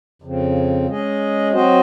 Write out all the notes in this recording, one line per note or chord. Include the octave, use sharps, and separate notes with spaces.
F2 C#3 F3 C4
G#3 C#4 G#4 D#5
F#3 C4 F#4 C5 D#5